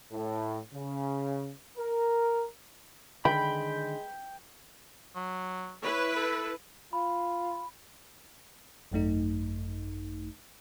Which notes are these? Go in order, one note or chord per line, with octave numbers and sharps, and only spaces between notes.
A2
C#3
A#4
D3 D#3 G#3 G5 B5
F#3
E4 B4 C#5
A4
F4 B5
G#1 F#2 A3 D#4